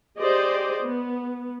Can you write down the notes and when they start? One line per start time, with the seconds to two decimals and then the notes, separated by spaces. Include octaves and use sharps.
0.17 G4 G#4 C5 D5 D#5
0.84 B3